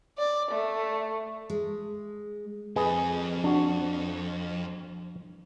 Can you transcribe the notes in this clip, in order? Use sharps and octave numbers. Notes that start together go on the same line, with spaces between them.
D5
A3
G#3
F2 G#4 B4 D#5
D4 F#4